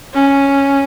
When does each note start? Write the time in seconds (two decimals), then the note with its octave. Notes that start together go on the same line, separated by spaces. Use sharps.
0.14 C#4